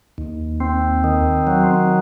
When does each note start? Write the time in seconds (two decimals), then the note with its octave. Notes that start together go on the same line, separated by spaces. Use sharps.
0.18 D#2
0.60 C4
1.04 D#3
1.47 F#3